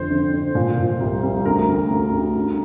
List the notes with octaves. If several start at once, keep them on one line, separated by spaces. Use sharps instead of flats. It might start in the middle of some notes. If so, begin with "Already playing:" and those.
Already playing: F2 D3 C5
D3
D3
A#2
A#2
C2
C2
D2 A#4
D2
D2
D2
D3